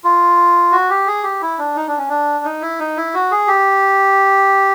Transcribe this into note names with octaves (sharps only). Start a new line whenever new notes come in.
F4
F#4
G4
G#4
G4
E4
D4
D#4
D4
C#4
D4
D#4
E4
D#4
E4
F#4
G#4
G4